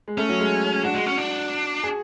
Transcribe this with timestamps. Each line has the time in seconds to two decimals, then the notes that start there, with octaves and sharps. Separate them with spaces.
0.08 G#3
0.18 A3 C#4
0.29 F#3
0.40 G#3
0.84 D4 F#4
0.95 G#3
1.06 C#4
1.17 D4
1.84 G#4